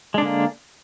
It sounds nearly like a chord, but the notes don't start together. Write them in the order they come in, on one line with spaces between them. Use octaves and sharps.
G#3 D4 D3 A#3